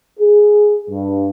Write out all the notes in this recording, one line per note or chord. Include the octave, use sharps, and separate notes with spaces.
G#4
G2